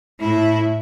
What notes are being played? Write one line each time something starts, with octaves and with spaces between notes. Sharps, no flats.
A2 E4